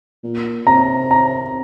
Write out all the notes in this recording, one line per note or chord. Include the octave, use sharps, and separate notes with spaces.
A#2
C3 A#5
A#5